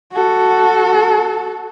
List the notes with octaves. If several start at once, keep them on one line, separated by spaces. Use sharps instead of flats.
F#4 A4